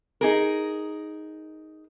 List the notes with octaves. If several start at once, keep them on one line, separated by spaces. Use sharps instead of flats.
D#4 G#4 A#4